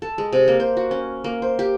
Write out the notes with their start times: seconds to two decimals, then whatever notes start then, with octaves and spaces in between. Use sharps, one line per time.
0.02 A4
0.18 G#3
0.33 C3
0.48 A#3
0.60 C5
0.77 F#4
0.91 C#4
1.24 A#3
1.42 C5
1.59 G4